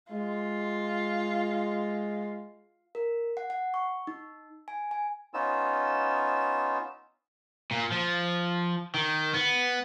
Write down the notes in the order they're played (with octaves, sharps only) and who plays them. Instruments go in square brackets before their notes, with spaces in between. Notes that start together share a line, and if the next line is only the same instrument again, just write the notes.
[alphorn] G#3 [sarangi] F4
[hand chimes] A#4
F#5
F#5
C#6
D#4
G#5
G#5
[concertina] B3 C#4 D#4 F4 E6
[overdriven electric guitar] A#2
F3
D#3
B3